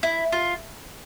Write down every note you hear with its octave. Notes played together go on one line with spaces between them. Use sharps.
E4
F4